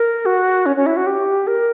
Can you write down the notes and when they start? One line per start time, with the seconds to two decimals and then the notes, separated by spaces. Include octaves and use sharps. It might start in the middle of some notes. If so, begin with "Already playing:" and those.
Already playing: A#4
0.26 F#4
0.66 C#4
0.76 C#4
0.86 E4
0.97 F#4
1.07 G4
1.47 A#4